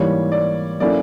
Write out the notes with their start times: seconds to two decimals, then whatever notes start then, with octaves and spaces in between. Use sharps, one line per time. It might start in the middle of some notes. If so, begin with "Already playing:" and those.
Already playing: G#2 E3 G3 A#3 C#5
0.32 D5
0.80 F#3 A#3 C#4 E4 A4 D5